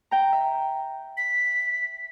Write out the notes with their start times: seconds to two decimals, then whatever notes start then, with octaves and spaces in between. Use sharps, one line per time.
0.11 G5 A#5
0.32 E5
1.17 B6